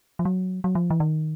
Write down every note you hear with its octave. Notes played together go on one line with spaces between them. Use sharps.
F3
F#3
F#3
F3
E3
D#3